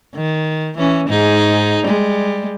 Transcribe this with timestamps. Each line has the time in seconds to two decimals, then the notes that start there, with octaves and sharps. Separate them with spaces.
0.15 D#3
0.77 E3 C#4
1.09 G#2 D#4 G#4
1.85 G3 G#3